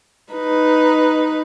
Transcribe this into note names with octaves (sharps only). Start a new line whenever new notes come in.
D#4 B4